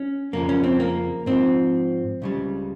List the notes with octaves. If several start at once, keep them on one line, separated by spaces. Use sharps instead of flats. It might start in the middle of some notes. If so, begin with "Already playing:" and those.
Already playing: C#4
F2 C#3 F3 A#3
C#4
C4
A#3
G#2 F3 C4
C#2 C#3 G3